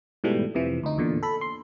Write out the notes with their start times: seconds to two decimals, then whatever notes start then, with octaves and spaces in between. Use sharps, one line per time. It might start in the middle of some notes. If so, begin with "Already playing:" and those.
0.24 G#2 B2 E3 G3 A3
0.55 F2 C3 E3 F3
0.83 D2 D#4
0.98 E2 A#2 D3
1.23 A4 B5
1.41 C6